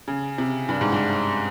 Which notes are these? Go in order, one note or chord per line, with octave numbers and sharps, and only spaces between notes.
C#3
C3
G2
G#2
G2